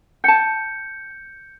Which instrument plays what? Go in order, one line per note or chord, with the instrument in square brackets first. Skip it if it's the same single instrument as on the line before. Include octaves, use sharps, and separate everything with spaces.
[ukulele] G5 A5 [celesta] G6 C#7